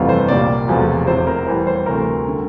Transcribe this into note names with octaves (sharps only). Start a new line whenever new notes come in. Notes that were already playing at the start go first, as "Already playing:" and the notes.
Already playing: G1 F2 C3 E3 A3 F4
C5
C2 A#2 G3 D5
E1 E2 C3 F3 A3
F1 E2 C3 C5
A#4
E2 E3 G3 C5
C5
D2 C3 E3 A3 A#4
D3 G3